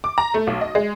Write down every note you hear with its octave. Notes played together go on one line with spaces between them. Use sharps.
D6
A#5
A3
B1
D#5
G#3